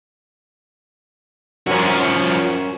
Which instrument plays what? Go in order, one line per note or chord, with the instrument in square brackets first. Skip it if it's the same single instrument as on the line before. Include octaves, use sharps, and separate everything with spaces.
[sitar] F#2 C#4 [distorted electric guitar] F3 F#4